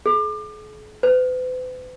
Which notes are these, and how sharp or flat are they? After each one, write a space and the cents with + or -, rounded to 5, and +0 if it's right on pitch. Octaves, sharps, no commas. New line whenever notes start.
G#4 +45
B4 +45